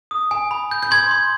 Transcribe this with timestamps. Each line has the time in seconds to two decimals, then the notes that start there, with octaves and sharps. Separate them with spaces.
0.11 D#6
0.31 G#5
0.51 B5
0.71 G6
0.83 G6
0.91 C6 G#6
1.11 C6